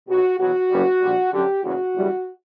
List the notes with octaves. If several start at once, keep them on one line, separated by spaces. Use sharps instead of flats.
B1 B2 F#3 F#4
E2 B2 F#3 F#4
F#1 F#2 C#3 G3
A#1 A#2 G3
F#2 D3 F#3 G4
F#1 E2 C#3 F#3 F#4
F#1 E2 C#3 E3 G3